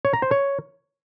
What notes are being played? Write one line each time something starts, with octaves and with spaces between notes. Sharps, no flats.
C#5
A#5
C5
C#5